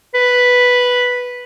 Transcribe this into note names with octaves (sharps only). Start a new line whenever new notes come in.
B4